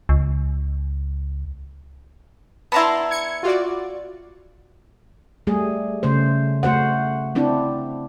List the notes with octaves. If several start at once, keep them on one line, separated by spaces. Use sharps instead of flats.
C#2
B3 D4 E4 A5 A#5 C6
G#6 C#7
F4 F#4 D5
G3 A3 G#4
C#3 A3 C5
A3 F#4 C5 F#5
C4 D4 E4